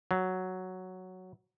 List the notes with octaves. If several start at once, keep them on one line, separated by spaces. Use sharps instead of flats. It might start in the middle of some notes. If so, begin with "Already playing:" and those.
F#3